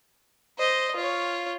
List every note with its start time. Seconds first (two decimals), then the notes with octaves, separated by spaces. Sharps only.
0.58 C5 D#5
0.95 F4 C#5